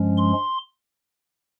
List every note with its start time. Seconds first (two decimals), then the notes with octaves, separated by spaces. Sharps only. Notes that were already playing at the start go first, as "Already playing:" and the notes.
Already playing: G2 F3 G#3 C#4
0.18 C6